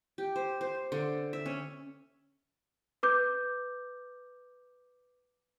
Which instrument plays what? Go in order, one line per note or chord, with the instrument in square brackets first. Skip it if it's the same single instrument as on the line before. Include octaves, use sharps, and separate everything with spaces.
[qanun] G4
C5
C5
D3
E5
C#4
[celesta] B4 D6 G6